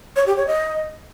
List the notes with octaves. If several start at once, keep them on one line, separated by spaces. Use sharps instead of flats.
C#5
G4
C#5
D#5